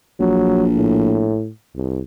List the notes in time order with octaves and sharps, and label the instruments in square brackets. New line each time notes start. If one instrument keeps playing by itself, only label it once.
[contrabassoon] A#1 [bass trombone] F#3
[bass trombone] A2
C2